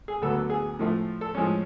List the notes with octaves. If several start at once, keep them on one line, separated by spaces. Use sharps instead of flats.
G#4
D2 D3 F#3 B3 A4
A4
G#4
A2 F3 A3
A4
A2 F3 G#3 C#4